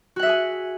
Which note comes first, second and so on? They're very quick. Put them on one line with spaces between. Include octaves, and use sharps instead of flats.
F#4 F#5 E5 G#4 G#5